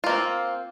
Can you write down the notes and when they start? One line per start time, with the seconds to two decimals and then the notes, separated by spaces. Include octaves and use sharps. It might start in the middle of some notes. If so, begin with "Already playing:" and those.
0.04 F4
0.06 A#3
0.09 C4